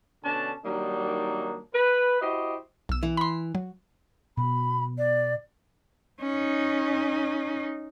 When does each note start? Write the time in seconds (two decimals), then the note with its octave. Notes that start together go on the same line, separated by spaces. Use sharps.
0.24 B2 D3 C#4 D4 A5
0.65 D#3 F#3 G3 A#3 D4 D#4
1.74 B4
2.22 E4 F#4 G4 C5 D#5
2.89 B1 E6
3.03 E3
3.17 B5 C6
3.55 F#3
4.37 B2 B5
4.98 D5
6.21 C#4 D#4